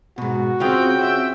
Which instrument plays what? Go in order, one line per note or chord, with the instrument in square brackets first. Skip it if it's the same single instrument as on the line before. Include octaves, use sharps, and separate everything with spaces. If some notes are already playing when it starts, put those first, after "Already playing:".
[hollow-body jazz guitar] G#2 B2 [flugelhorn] F#4
[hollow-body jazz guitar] C#3 C#4 F4 [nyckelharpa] C4 G#4 [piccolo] G5
[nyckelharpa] C4 E5